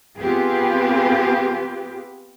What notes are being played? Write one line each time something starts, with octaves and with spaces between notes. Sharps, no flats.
B3 C4 F4 G4 G#4 B4